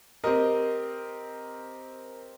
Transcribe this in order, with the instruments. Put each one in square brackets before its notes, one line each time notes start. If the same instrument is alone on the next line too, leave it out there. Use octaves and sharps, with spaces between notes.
[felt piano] C4 G4 D#5 [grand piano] A#4